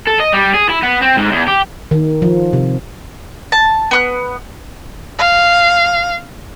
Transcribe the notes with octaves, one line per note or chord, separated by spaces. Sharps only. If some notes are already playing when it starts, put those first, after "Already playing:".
A4
D#5
G3
G#4
E4
B3
C4
G#2
E2
G4
D#3
F3
C3
A5
B3 C6 F#6
F5